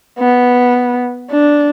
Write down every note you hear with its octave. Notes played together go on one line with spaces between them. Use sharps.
B3
D4